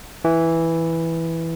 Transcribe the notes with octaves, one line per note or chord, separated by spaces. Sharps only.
E3